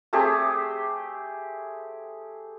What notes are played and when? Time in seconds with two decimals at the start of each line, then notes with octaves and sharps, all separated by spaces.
0.13 A3 C4 G4 G#4